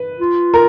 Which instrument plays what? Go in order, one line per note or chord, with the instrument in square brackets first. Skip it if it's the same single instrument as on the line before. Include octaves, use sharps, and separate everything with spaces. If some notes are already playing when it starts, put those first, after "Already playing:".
Already playing: [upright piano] B4
[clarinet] F4
[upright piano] A#4